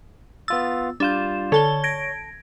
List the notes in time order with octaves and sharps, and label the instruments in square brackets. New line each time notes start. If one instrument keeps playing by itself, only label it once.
[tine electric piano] B3 F4 A6 [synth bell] E6
[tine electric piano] G3 F4 G6 [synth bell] D4 E7
[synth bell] D3 A5 G7 [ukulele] A4 [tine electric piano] C#5
[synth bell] G#6 A#6 D7